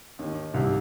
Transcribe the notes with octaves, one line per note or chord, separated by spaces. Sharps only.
D#2 D#3
C2 C3